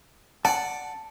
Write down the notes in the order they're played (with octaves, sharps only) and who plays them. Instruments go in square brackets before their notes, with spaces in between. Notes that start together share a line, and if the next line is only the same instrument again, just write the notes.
[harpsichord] D5 F#5 [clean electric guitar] A5